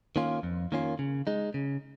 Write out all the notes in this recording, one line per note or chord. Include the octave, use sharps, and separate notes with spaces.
D#3 A#3 C#4 F4
F2
D#3 A#3 C#4 F4
C#3
G#3 D#4
C#3